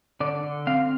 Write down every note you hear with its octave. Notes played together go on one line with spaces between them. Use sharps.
D3 D5
D3
C4 F5